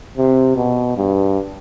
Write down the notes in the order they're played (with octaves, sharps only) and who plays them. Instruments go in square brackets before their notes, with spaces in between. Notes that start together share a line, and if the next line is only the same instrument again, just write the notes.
[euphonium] C3
B2
G2